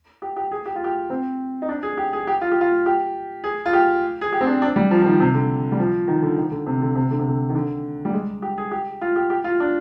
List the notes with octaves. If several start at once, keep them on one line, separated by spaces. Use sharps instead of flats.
G4
G4
G#4
G4
F4
G4
C4
D#4
D4
G#4
G4
G#4
G4
F4
G4
F4
G4
G#4
F4
G4
G#4
G4
C4
D4
D4
G3
F3
F3
D#3
C3
D3
G3
F3
D#3
D3
D#3
D3
C3
D3
C3
D3
C3
D3
D#3
D3
G3
G#3
G4
G#4
G4
F4
G4
G4
F4
D4